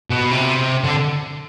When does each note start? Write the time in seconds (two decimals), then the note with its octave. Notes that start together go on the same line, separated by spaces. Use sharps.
0.10 B2
0.31 C3
0.84 D3